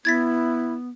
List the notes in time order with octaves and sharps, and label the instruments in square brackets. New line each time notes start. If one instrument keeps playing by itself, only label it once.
[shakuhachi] B3 [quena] E4 [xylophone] G#6 A6 B6